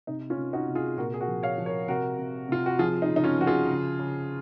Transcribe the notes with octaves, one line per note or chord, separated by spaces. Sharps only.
C3 D#4
C#4 F4
C3
D#4 F#4
C3
F4 G#4
A#2 F#4 A#4
G#4
F#4 A#4
F3
C#5 F5
F3
A#4 C#5
C3 F#4 A#4
C3
C3 F4
F#4
F3 F4 G#4
D#4
C#3
D#4
C#4 F4
F3 F#4
F4 G#4
C#3
C#3